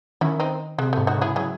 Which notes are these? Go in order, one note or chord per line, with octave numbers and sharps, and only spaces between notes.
D#3 C#4 E4
C4 D#4
C3 G#3
G#2 A3
D#4 F#4
C#3 E4 G#4
F#3 E4 G#4